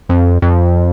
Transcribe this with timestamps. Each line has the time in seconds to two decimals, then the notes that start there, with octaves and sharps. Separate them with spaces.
0.09 F2
0.42 F2